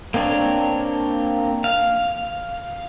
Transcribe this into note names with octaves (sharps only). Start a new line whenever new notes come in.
A#3 C4 D4 C#5
F5